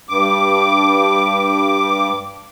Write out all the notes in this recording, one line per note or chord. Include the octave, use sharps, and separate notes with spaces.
G2 D6